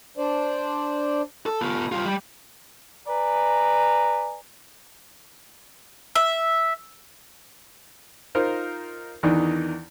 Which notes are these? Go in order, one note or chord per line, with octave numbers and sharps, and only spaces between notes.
D4 C5 D5
A4
B3 F4
G3 F4
G3
B4 D5 G#5 A#5
E5
D#4 F4 A#4 C5
E2 D#3 E3 D4 D#4